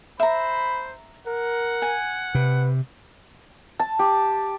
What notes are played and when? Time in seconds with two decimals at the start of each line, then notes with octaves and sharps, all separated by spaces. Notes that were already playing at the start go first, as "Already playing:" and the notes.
0.20 C5 E5 A#5 B5
1.27 A#4 F#5
1.82 G#5
2.35 C3 B4
3.80 A5
3.99 G4